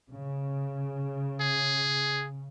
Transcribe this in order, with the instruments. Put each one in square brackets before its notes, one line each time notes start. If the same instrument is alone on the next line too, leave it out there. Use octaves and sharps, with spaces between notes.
[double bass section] C#3
[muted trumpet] G#4